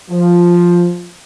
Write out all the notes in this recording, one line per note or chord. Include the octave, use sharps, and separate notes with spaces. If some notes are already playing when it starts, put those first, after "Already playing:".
F3